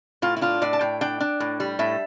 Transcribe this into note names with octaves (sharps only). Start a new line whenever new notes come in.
A2 F4
E4
D4 F4
A2 D5
A5
A2 G5
D4 G5
D4
A2
G3
A2 E5